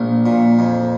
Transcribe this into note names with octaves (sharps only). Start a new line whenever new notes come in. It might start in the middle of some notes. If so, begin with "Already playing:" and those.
Already playing: A#1
A#2
F2